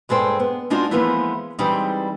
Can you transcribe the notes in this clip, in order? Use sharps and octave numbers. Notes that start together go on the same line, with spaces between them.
G2 G#3 A4 C5 G5
B3
G#3 D4 D#4 F4 F#4
E3 F3 G#3 A#3 B3 E4
E3 G3 G#3 C4 D#4